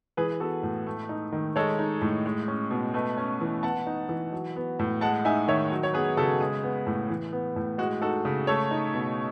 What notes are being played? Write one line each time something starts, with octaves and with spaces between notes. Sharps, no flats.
E3 G#4 B4
B3 F#4 A4
A2
A3
D#4
D#3
G#3 A4 C#5
D#4
A2
G#3
C#4
B2
A3 B4 D#5
C#4
E3
B3 F#5 A5
D#4
E3
F#3
B3
A2
G#3 F#5 A5
D#4 E5 G#5
D#3 C#5 E5
F#3
C#5
B3 G#4 B4
C#3 F#4 A4
G#3 G#4
B3
A2
E3
B3
A2
G#3 F#4
D#4 F#4 A4
C#3
A3 A4 C#5
D#4
B2